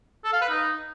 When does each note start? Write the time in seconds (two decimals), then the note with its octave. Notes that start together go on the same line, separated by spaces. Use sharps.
0.24 A4
0.33 F5
0.41 B4
0.49 D#4